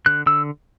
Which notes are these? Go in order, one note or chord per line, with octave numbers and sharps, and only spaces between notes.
D3 F#6
D3 E6